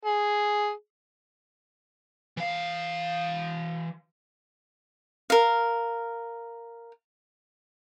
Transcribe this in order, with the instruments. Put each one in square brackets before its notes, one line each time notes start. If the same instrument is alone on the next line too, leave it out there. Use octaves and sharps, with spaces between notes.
[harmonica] G#4
[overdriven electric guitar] E3 F5
[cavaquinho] A#4 F5